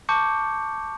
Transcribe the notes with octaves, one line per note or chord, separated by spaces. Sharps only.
A5 C#6 D6 G6 C#7